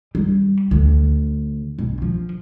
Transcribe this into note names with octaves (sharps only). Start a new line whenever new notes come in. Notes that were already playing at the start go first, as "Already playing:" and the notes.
G3
D2
B1
F3